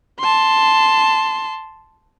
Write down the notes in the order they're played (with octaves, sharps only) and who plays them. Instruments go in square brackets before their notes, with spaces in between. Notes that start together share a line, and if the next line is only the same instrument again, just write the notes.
[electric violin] A5 C6